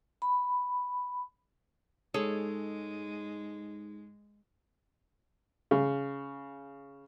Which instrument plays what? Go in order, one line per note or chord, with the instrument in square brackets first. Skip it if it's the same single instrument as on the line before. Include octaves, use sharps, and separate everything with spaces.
[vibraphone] B5
[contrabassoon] G#2 [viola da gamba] G#3 [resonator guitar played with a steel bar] G#4 A4 C#5
[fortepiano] C#3